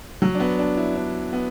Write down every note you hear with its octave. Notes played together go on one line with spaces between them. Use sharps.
F#3
D4
B3
D4
E4
D4
B3